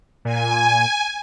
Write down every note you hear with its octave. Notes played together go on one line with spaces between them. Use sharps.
A#2 G#5